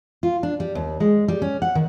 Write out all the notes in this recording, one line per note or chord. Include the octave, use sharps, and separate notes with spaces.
F4
D4
G3
D#2
G#3
G3
C#4
F#5
D#3